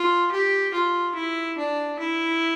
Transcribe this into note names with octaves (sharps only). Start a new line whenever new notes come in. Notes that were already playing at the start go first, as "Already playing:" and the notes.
Already playing: F4
G4
F4
E4
D4
E4